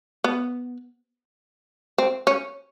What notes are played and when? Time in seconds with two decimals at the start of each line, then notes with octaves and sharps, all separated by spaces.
0.24 B3
1.98 C4
2.27 C#4